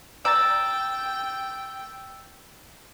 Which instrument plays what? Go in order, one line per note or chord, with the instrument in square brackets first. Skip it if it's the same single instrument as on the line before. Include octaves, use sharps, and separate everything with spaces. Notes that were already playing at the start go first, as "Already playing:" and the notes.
[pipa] D5 A#5 [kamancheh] G5 [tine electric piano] E6 A6